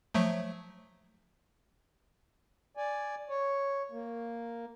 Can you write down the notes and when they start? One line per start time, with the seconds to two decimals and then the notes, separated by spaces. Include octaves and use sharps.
0.14 F3 F#3 A3
2.77 D5 G#5
3.30 C#5
3.92 A#3